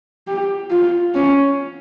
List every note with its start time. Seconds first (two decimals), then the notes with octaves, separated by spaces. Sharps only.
0.27 G4
0.70 F4
1.15 C#4